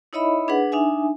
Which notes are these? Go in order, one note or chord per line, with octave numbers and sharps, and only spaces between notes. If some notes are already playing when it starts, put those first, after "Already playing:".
D#4 E4 C#5 D#5 E5 B5
D4 G#4 B4 F#5
D4 D#4 E5 G#5